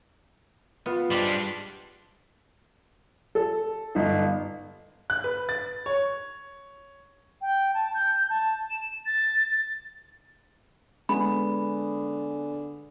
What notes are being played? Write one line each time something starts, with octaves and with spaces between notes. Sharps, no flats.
B3 F4 B5
G3 G#3 D4 G4 C5 D5
A4
G1 D#4
F#6
B4
A6
C#5
G5
A5
G6
A5
E7
A6
D3 G#3 B3 B5